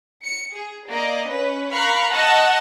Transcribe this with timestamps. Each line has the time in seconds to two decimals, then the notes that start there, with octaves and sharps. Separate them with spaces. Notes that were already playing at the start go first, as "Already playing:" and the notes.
0.24 C#7
0.55 G#4
0.88 A#3 D5 D#5
1.27 C#4 B4
1.71 A#4 F5 B5 C#6 F6 F#6
2.12 D#5 F#5 A5 C#6 E6 A#6